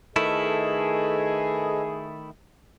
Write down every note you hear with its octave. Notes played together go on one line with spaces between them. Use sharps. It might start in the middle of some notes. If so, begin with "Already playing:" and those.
D#3 A3 E4 G#4 A4 B4 D#5